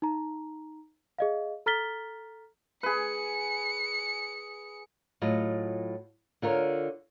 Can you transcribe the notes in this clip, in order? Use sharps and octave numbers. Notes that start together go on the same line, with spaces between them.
D#4 A#5
G#4 D#5 F5
A4 A#5 F6 A6 B6 G7
G#4 B4 C#7
A2 F#3 F4 D#5
D3 F4 A#4 C#5